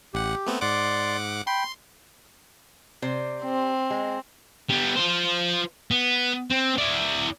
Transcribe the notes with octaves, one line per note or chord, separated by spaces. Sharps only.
A1 G4 F#5
A3 B3 C4
G#2 D5 F#5 C6 D6
G5 B5 C6
C3 C5 D5
C4
G#3
G3 B3
F4 C5
B3
C4
E4 D5